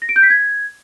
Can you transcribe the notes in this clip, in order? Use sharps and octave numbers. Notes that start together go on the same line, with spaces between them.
A#6
D7
G6
B6
G#6